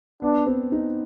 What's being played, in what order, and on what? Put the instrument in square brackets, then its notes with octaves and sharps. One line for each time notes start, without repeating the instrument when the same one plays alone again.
[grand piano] B3 [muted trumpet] D4
[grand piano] C4
D#4